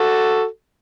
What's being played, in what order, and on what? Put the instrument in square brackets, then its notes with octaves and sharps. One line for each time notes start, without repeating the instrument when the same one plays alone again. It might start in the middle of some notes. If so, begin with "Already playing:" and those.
Already playing: [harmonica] F#4 A4